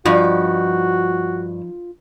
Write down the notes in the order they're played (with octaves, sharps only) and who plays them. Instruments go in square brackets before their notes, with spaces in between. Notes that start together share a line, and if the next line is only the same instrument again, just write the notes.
[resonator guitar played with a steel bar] G2 [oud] F3 D#4 D5 [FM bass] F4 [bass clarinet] F#4